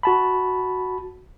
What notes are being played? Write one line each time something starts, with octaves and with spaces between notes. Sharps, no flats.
F#4 A5 B5